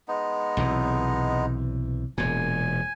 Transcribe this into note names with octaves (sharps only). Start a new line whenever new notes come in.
G#3 B3 D#4
B1 C3 E3
E1 A#2 G#5